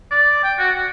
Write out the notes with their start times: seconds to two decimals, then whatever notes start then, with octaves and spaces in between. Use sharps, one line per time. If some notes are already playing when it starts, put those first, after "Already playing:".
0.11 D5
0.44 G5
0.59 F#4
0.75 F#4